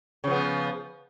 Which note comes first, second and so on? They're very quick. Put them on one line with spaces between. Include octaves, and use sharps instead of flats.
C#3 F3 B3